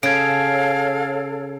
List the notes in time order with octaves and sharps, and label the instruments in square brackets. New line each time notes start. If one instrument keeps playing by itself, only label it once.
[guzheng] C#3 [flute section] A4 C#5 [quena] F5 [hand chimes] G#6 D7